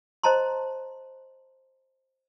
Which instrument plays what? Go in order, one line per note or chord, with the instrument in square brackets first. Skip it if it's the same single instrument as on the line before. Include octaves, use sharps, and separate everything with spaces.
[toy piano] C5 D#5 A5 A#5 C6